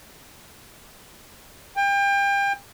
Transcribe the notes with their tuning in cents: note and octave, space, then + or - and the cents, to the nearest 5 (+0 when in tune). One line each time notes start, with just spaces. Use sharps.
G5 +30